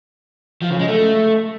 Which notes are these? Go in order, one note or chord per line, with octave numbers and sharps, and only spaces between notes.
F3
C#3
G#3
A3